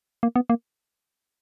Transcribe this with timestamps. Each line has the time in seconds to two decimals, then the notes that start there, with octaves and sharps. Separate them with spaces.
0.23 A#3
0.36 B3
0.50 A#3